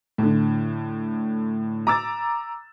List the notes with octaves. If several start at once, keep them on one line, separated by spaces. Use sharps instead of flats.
A2 D3
A#5 D6 E6 A6